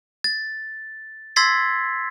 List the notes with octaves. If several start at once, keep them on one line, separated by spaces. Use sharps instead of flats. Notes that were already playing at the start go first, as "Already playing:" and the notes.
A6
C6 E6 G#6 A6 B6 C7